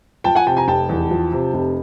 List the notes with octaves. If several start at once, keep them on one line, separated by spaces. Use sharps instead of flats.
F3 G5 A5
F#5 G#5
C3 G5 A5
G#5 A#5
F1 G5 A5
E2
F3
C3
F1